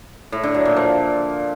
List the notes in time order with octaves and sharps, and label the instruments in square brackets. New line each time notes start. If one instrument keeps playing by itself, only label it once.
[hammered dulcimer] A2
D3
F#3
A#2
F3